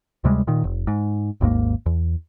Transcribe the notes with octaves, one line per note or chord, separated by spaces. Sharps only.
D2 C3 G3 G#3
A#2 D#3
F1
G#2
G#1 D#2 G#2 A#3
E2